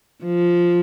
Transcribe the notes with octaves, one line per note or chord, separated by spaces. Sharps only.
F3